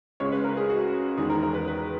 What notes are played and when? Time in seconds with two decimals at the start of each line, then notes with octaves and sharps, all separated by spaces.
0.20 C#2 C#3 G#3 C#5
0.32 B4
0.44 A#4
0.57 G#4
0.70 F#4
1.18 E2 D#3 G#3 G#4
1.30 A#4
1.43 A#4
1.54 B4
1.67 B4